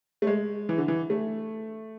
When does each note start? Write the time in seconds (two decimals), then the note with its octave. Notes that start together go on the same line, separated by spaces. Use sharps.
0.22 A3
0.27 G#3
0.69 E3
0.78 D3
0.88 E3
1.10 A3